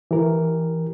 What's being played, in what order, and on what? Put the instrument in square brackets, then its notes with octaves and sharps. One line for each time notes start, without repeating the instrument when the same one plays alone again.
[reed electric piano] E3 G4 A#4